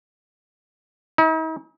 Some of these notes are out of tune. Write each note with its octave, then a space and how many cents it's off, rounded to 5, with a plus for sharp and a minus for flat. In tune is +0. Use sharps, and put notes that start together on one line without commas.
D#4 +45